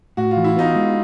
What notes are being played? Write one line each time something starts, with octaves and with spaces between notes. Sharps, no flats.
A2 F#4
F4
E3
E4
B3 D#4 F4
G#3